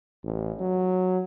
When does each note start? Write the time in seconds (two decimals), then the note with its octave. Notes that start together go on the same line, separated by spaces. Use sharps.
0.24 A1
0.60 F#3